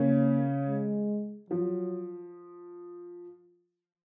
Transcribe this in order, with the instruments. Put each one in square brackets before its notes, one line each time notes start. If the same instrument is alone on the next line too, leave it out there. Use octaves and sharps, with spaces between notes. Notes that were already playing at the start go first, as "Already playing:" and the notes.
Already playing: [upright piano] C#3 C#4 [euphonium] A#3
[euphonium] G#3
[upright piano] F3 [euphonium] F#3